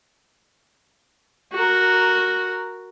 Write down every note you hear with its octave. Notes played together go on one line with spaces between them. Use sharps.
F#4 A#4